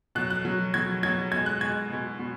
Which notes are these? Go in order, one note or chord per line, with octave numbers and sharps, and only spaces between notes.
B2 F#3 F#6
F#6
B2 F#3
B2 F#3 G#6
B2 F#3 G#6
B2 G#3 G#6
F#6
B2 G#3 G#6
B2 G#3
B2